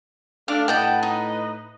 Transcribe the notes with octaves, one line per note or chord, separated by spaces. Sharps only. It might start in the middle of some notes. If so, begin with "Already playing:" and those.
A3 D4 F5
A2 B4 D#5 F#5 G5 A5
D#4